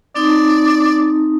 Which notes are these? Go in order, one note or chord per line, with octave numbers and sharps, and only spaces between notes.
C4 D#4 D5 D#6